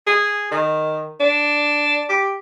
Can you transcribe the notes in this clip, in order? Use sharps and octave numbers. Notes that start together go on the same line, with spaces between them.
G#4
D#3
D4
G4